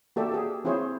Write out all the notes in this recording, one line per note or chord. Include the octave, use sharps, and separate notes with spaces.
A#3 F#4 G4 A4 D5 E5
G4 G#4
C4 E4 F4 G#4 C5 C#5